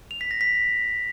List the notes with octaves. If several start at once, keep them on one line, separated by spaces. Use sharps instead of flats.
F7
B6
A#6
B6